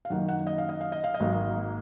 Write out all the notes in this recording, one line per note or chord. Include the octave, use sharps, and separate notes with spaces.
F5
F#2 D#3 A#3 F#5
F#5
D#5
F5
D#5
F5
D#5
F5
D#5
G#1 G#2 F#3 A#3